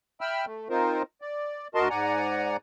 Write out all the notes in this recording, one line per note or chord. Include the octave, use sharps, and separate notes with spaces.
E5 G5 B5 E6 F6
A3
C4 D#4 F4 A#4 C5
D5
D2 F#4 A#4 D#5 A5 C6
G#2 D5 F#5 G#5 A#5